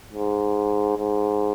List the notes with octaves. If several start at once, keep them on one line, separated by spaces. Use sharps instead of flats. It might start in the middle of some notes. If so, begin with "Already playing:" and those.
G#2
G#2